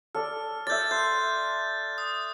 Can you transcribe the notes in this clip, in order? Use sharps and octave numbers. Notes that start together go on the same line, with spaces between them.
A4 D5 F6
D5 E5 G6 A6
C6 F#6 G6
D#6